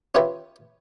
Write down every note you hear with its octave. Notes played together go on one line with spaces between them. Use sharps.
C#4 F4 G4 B4 C#5 E5